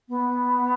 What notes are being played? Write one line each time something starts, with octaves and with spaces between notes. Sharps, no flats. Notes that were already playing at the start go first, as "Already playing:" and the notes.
B3